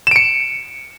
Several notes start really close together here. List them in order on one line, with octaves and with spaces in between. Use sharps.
E7 D7 C#7